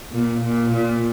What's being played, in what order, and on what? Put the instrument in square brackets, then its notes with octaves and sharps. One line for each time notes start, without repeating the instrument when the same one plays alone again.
[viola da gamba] A#2
A#2
A#2